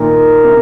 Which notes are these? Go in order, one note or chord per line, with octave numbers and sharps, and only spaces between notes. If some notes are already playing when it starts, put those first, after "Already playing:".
Already playing: A#2 D#3 A#4
C3